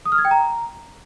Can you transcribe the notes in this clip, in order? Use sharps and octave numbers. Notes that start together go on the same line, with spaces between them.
D#6
F6
G#6
G5
A#5